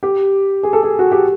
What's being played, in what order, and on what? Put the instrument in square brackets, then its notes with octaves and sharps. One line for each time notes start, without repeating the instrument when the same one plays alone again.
[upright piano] G4
G#4
A4
G#4
F#4
G4